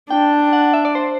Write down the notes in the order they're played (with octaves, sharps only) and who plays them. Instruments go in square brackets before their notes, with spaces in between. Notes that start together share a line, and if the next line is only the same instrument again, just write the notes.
[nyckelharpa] D4 [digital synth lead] G5
[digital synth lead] F#5
E5
D5
C5